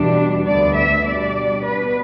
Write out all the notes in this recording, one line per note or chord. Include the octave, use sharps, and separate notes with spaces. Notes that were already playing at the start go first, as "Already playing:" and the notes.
Already playing: E2 B2 G3 D4
D2 D3 B3 D5
E5
B2 G3 D4 D5
B2 B3 D4 B4